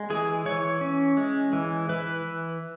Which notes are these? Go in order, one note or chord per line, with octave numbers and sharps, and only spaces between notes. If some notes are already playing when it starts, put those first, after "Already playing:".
Already playing: G#3
E3 G#4
E3 C#5
C#4
G#3
E3
E3 B4